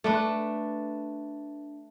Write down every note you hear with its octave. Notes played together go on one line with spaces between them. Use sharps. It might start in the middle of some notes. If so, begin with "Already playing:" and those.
A3 D4 B4